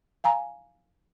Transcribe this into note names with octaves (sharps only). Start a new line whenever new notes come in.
F5 G#5 A#5